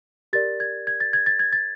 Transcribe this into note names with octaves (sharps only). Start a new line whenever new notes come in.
G4 A#4 D5 A6
G#6
G#6
A6
G#6
A6
G#6
A6